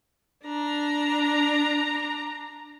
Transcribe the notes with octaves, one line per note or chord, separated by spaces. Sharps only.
D4 A#5